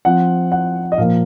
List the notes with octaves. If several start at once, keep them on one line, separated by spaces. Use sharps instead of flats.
F3 C4 F4 F#5
F#5
D#5
A#2 F3 A#3 F5